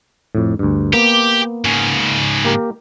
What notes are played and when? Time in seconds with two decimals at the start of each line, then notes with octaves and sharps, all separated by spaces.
0.35 F2 A2
0.59 D2 G2
0.93 A#3 B3 G4
1.65 G#2 C#3
2.45 A#3 G4 A#4